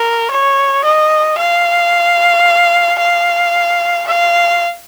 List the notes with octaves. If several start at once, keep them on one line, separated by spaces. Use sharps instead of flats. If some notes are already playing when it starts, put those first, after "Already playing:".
Already playing: A#4
C#5
D#5
F5
F5
F5